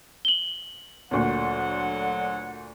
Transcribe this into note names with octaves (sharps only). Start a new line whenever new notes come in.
F#7 G7
D2 A#2 D3 F#3 F#5